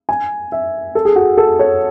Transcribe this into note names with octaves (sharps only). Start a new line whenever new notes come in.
G#5
E5
A4
G#4
F#4
A4
C#5